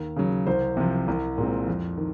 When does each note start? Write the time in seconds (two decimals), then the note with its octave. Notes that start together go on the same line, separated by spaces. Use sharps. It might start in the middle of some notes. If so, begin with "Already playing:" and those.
Already playing: D#2
0.16 C#3 F#3
0.47 C2 C5
0.77 C3 F3
1.08 C2
1.38 A#2 G#3 C4
1.67 F2
1.97 D#3